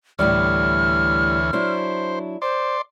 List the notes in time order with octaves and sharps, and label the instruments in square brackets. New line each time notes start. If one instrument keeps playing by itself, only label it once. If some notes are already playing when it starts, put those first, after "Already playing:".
[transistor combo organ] D2 E3 C#5 [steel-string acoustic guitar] A2 G3 D5 [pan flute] F6
[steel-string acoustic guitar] F#3 D4 E4 [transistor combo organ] C5
[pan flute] C5 [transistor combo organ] D5 C6